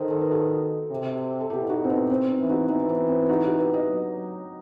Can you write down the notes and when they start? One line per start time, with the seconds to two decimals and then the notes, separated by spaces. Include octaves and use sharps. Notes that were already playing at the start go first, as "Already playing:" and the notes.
Already playing: D#3 A4 C5 D#5
0.10 A4
0.21 B4
0.31 F#4 A4
0.90 C3
1.40 A4
1.50 B2 E4 G4
1.69 D#4 F#4
1.84 C4
1.90 B3 D#4
2.10 C4
2.30 B3 D#4
2.40 E3
2.49 D#4 F#4
2.69 E3 B3 D#4
2.80 D#4
2.89 C4
3.09 C4
3.29 D#4 F#4
3.44 D#4 F#4
3.59 G4 B4
3.74 B4 D#5
3.89 F#3